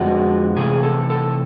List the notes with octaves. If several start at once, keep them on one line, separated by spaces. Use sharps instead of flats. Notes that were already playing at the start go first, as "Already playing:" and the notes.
Already playing: F2 D3 F3 G#3 B3 F#4
C3 E3 A3 G#4
A4
A4